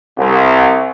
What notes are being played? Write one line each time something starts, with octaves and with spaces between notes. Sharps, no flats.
C2